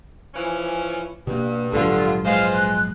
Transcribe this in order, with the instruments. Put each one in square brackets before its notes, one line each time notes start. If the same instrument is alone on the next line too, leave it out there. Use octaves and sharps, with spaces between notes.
[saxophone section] E3 F3 C#4
[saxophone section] G2 [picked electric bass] B2 A#3
[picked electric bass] A#1 G#2 F#3 [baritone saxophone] D3 [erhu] F4
[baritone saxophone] G#3 [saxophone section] F4 B4 C5 [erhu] F5
[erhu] F#6